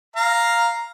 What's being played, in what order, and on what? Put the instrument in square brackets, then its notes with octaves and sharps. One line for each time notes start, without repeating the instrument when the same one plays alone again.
[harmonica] F5 A#5